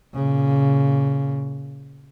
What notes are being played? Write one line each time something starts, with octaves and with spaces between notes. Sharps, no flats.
A#2 C#3